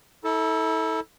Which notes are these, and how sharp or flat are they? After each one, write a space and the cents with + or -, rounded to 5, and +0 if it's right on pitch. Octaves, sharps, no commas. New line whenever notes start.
E4 -40 A4 +0